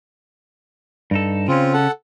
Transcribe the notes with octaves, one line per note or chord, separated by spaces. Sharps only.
G2 D#4 A4
C#3 C4 C#4 F4
A4 F#5